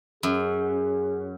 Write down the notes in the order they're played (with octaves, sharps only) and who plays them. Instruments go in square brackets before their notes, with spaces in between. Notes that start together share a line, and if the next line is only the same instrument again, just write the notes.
[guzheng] F#2 [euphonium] G#4